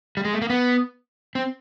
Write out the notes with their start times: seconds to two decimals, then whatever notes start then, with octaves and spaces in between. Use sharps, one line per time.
0.17 G3
0.25 G#3
0.33 A3
0.42 A#3
0.50 B3
1.35 C4